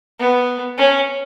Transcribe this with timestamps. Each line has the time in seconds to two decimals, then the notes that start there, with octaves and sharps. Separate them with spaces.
0.19 B3
0.78 C#4